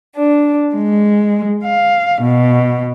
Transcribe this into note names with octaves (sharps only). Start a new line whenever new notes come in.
D4
G#3
F5
B2